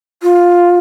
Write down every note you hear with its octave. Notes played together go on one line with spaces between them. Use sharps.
F4